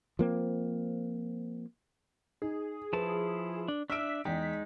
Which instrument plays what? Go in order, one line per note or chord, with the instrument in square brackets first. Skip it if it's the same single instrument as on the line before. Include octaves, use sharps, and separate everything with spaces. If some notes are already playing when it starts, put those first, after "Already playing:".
[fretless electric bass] F3 A#3 C4
[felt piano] D#4 [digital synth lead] G#4
[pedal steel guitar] F3 E4 A5 [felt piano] B4
[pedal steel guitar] D4
[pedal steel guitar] D4 E5 [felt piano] E6 F6 D7 [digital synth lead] B6
[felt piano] E2 G5 [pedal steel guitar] G#3 D#4 [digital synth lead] B6